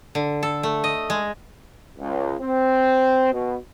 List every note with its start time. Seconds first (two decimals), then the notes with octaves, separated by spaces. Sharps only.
0.15 D3
0.43 A4
0.63 A3
0.84 D#5
1.10 G#3
1.98 C#2
2.41 C4
3.32 B2